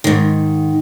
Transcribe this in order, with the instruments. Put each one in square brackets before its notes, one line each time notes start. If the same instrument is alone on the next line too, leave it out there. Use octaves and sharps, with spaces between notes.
[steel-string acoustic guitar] G#2 D#3